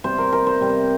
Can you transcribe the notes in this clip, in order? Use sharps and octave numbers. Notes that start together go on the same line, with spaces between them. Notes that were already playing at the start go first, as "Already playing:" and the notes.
C3 G3 C5
A#4
A#4
C5
C3 G3